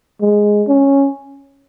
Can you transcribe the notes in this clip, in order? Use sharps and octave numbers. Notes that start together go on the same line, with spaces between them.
G#3
C#4